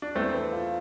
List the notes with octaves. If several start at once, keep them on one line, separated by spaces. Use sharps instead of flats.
D4
E2 A3 C4
B3
F4